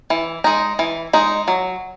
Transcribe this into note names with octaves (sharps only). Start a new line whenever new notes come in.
E3
G#3 D#4
E3
G#3 D#4
F#3